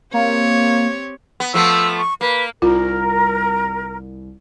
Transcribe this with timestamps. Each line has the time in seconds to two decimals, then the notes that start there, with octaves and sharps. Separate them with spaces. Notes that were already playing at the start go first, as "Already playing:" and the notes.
0.14 A#3 C4 G4 C#5
1.40 B3
1.54 F3 A3 B3 E6
1.99 C#6
2.21 A#3 B4
2.62 C2 F4 A#4